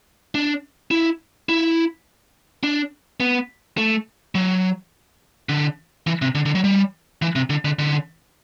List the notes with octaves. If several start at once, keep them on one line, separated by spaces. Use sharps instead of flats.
D4
E4
E4
D4
B3
A3
F#3
D3
E3
C3
D3
D3
F#3
G3
E3
C3
D3
D3
D3